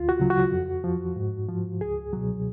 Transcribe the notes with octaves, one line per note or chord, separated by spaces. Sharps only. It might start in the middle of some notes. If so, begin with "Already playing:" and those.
Already playing: D2 F4
F#4
C#3 F#3
F#4
F2
F3
G#2
F3
C#2 G#4
B2 F#3